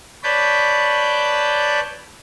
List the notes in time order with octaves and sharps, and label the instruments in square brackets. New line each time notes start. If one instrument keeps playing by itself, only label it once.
[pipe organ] B4 C#5 D5 A5 B5 G6